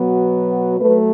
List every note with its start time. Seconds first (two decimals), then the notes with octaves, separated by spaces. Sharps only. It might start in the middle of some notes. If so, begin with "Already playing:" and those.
Already playing: B2 F#3 B3
0.80 F#3 A3 B4